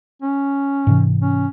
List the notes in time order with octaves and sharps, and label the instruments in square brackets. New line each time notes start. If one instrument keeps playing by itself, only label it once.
[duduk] C#4
[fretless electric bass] G#2 C3 E3
[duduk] C#4